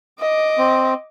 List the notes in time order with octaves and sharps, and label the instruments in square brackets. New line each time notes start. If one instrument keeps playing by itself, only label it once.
[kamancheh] D#5 D6
[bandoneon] C4